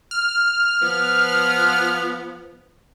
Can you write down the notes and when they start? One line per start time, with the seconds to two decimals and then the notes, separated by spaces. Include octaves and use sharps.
0.11 F6
0.82 F3 B3